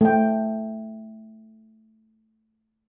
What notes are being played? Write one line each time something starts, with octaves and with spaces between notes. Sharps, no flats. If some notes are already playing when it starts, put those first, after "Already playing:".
A3 G5